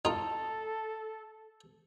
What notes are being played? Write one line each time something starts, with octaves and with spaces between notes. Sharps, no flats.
D#4 F4 A4